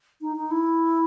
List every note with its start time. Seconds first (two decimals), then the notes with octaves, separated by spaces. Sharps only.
0.21 D#4
0.36 D#4
0.51 E4